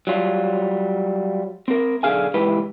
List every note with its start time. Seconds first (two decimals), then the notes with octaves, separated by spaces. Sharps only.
0.07 F#3 G3 F4
1.68 C4 A#4
2.03 B1 A#2 D3 G#4 F5 G#5
2.34 C#2 G#2 E3 G4 B4